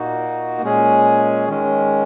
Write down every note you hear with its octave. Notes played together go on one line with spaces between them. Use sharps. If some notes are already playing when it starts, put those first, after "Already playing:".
Already playing: A#2 A#3 D#4 F#4
A#2 G#3 C#4 G#4
D#3 G#3 C#4